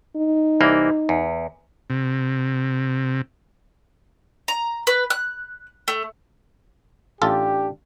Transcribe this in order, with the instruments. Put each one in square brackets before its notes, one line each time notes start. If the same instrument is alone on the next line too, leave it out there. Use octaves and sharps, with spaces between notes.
[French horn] D#4
[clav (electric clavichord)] C2 E3 A#3
E2
[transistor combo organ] C3
[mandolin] A#5
B4
F#6
A3
[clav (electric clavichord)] A1 F4 A4 [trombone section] D4 G4